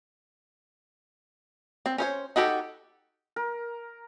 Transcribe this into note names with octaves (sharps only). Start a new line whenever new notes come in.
C4
C#4 C5 C#5
D#4 F#4 G4 A4
A#4